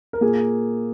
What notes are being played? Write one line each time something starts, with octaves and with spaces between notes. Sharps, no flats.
A#4
A#2 A#3 G#4